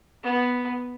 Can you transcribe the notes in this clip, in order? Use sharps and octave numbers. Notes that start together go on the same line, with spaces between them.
B3